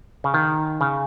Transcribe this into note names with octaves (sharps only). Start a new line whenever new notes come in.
C#3
D#3
C#3